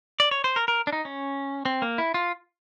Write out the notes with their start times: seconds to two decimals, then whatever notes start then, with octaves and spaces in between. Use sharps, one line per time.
0.20 D5
0.31 C#5
0.44 C5
0.56 A#4
0.68 A#4
0.87 D4
0.93 D#4
1.05 C#4
1.65 C4
1.82 A#3
1.98 E4
2.14 F4